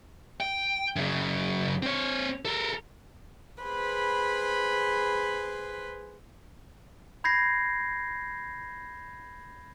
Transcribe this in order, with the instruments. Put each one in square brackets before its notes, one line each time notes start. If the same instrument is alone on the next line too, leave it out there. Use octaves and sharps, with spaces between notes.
[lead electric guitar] G5
F#2 C#3
C4 C#5
A4 A#4
[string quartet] G#4 B4 C5 B5
[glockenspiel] B5 G6 G#6 A#6 C7